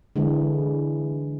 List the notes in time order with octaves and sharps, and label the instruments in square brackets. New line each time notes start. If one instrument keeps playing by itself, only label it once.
[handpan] D3 E3 G#3